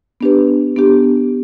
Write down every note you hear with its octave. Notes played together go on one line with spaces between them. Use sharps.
B3 D4 G4 B4
B3 D4 G4